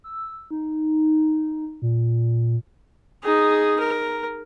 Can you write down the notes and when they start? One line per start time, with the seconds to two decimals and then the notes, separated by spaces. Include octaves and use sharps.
0.04 E6
0.51 D#4
1.82 A#2
3.23 D#4 G#4
3.79 A#4